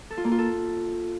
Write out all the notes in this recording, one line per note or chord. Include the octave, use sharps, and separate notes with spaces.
A4
F4
A#3
F4
A4